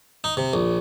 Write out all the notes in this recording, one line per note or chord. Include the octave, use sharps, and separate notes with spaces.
D#4
C3
A#1